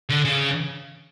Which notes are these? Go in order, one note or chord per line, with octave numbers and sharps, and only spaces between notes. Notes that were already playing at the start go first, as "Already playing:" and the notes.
D3
C#3